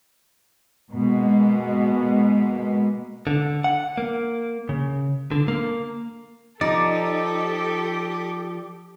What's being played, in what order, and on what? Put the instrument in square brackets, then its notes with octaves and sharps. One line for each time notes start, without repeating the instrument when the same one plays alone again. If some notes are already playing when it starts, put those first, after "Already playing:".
[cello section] B2 G#3 A#3
[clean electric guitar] D3
F#5
A#3
C#3
D3
A#3
[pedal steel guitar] F3 D5 D6 [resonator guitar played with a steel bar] D#4 [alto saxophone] G4 [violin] A4